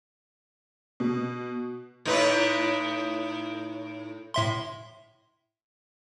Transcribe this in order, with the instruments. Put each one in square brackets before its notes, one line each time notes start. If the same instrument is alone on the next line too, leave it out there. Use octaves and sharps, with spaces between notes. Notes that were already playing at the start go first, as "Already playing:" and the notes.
[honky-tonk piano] B2
[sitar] A2 D#4 B4
[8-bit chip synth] A2 E5 C6